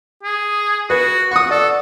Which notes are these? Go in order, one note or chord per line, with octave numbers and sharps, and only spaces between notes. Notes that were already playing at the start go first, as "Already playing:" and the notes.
G#4
F#4 B4
F#5 C#6 D#6
A4 D5